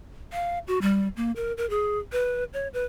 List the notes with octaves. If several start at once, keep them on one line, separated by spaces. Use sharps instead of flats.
F5
F#4
G3
A#3
A#4
A#4
G#4
B4
C#5
B4